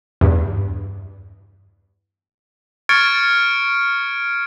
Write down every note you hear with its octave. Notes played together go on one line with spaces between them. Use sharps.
E2 G2
C#6 F6 G#6 A6 C#7 D7